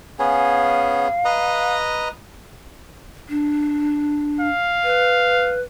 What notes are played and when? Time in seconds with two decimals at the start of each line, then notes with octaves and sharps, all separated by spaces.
0.19 B3 C#4 G#4 F5
1.25 B4 D#5 A#5
3.29 D4
4.41 F5
4.84 B4